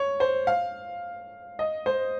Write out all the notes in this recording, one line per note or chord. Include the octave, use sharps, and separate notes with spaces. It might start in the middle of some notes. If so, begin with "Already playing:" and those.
Already playing: C#5
C5
F5
D#5
C5